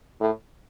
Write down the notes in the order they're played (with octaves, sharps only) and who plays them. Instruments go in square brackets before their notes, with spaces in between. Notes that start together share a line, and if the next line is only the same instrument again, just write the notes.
[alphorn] A2